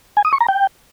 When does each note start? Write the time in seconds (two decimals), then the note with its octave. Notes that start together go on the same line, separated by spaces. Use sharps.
0.17 G#5
0.25 D#6
0.33 C#6
0.41 A#5
0.48 G5